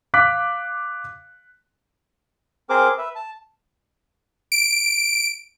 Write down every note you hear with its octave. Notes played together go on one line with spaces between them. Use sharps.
F5 D6 F#6 B6
C4 G#4 A#4 C5 D6
B4 E5
A5
D7